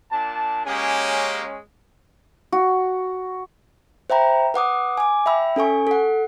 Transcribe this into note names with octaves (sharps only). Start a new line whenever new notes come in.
A#2 D4 A5
G#3 A#3 C#4 G4 G#5
F#4
C5 E5 G5 A#5 B5
B4 F#5 D6 D#6
G#5 D6
E5 G5 B5 E6
C#4 A4 G#5 C#6
A4 F#5